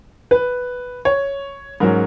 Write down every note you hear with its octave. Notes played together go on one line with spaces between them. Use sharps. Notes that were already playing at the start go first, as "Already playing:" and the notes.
B4
C#5
G#2 F#3 C#4 A#4